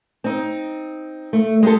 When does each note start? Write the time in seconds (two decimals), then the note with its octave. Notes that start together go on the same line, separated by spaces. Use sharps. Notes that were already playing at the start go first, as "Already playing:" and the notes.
0.24 C4 D#4
1.33 A3
1.63 G#3 G4 A4